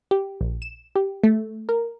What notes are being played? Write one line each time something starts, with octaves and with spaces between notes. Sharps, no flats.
G4
A#1
E7
G4
A3
A#4